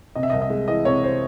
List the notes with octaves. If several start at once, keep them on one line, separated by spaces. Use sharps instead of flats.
C3 D#5
E5
D#5
C2
D#5
G#3
E3 D#5
C3 C#5
C5